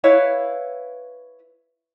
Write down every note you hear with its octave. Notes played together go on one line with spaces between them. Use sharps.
E4 B4 C#5 F5